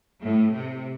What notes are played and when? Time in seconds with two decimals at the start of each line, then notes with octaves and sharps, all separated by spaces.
0.23 A2
0.56 C3